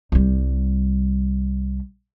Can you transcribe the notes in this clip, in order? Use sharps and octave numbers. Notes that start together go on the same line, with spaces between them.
C2 G3